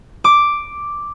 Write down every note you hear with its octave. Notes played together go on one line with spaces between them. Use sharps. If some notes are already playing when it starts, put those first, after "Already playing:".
D6